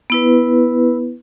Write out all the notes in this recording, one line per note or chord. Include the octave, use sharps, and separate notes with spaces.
B3 E4 B4